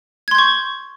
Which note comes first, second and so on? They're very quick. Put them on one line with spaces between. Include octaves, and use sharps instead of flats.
G#6 C6 G6 C#6